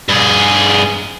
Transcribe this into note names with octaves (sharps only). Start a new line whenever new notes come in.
G2 G#4